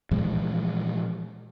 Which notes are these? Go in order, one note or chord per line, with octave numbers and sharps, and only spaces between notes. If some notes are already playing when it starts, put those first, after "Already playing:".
A#2 E3 F3 G#3